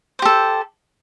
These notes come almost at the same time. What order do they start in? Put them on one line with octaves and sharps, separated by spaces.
C5 G4 A4